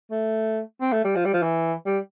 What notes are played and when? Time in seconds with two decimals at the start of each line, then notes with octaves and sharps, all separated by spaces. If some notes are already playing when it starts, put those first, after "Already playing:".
0.11 A3
0.81 C4
0.93 A3
1.04 G3
1.16 F3
1.25 G3
1.34 F3
1.43 E3
1.86 G3